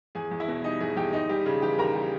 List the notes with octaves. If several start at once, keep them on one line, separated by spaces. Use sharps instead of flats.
E2 G#4 G#5
E2
E4 E5
B2
G3 D#4 D#5
E2 G#4 G#5
E2 G4 G5
D#2 D#4 D#5
G3 G4
C#3 G#4
E3 G4 G5
D#2 A#4 A#5
G3